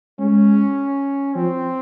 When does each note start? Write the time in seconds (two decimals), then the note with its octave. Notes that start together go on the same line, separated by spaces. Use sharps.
0.19 G#3 C#4
1.34 F3 C4